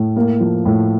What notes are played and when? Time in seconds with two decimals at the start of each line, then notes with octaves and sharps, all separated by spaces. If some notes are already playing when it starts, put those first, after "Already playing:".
Already playing: A2
0.16 A#3
0.40 F3
0.65 A2